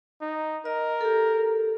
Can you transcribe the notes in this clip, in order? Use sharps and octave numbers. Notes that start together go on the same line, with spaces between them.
D#4
A#4 D#5
G4 A4